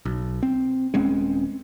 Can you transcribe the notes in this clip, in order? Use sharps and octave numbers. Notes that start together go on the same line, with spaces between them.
B1
C4
D#1 G#3 C4 C#4